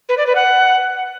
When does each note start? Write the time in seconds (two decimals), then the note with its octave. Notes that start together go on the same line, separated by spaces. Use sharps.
0.09 B4
0.18 D5
0.26 B4
0.35 F#5